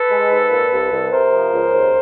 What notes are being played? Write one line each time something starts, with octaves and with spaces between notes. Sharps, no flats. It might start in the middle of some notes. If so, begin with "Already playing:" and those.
Already playing: A4 B4
G#3
G#2
A#2
C2
C2
C3 A#4 C5
F3
C#2
D#2